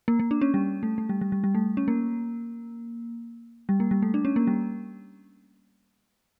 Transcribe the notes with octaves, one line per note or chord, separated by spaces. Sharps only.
A#3
A#3
D4
C#4
G3
A3
A3
G3
G3
G3
G3
A3
C#4
A#3
G3
A#3
G3
A3
D4
C#4
A#3
G3